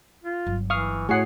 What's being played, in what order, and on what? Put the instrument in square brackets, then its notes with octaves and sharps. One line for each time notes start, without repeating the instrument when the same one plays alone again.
[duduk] F4
[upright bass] G1 F#3
[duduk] E3 [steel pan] F5 [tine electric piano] C#6 D#6 F6
[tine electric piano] A2 F#4 C7 [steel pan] G#4 F#5 [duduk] C#5